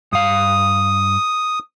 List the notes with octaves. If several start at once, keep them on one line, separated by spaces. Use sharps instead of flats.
G2 F5 D#6